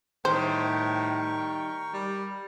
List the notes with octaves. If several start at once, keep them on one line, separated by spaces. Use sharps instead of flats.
A2 D#3 G3 A#4 C5 G5 C#6
G3